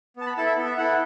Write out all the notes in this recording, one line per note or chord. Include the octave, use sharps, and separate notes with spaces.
B3 A5
B5
E4 A4 A5
E5
B3
E5
E4 A4 F#5